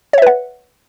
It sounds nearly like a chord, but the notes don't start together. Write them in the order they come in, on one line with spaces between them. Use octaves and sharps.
C#5 E5 B4 F#5